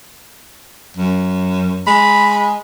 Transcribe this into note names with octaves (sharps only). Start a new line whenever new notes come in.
F#2
G#3 B5